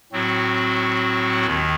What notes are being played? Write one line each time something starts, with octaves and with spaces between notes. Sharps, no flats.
A2 F#3 C4 F#4
D#2 D#3